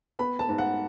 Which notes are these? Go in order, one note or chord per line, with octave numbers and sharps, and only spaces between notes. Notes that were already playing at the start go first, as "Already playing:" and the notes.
B3 B5
A5
G#2
F#5